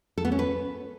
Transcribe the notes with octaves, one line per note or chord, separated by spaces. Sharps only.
A4
B3
C#4
B4